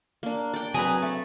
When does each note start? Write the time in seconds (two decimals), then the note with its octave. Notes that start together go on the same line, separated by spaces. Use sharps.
0.23 A#3 D4
0.54 D5 G5
0.74 F#3 C4 G#4 B4 A#5
1.02 A3